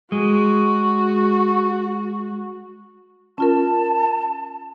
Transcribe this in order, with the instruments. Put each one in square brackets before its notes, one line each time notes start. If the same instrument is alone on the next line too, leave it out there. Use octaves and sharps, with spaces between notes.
[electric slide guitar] G#3 [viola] F#4
[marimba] C#4 F4 A#4 [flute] A5